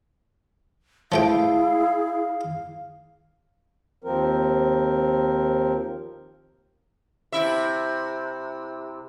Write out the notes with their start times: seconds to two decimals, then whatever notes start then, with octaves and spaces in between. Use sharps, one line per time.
1.12 F3 A3 E4 G#4 F5 G5
4.04 D#2 F3 C4 A#4
7.32 C3 E4 E5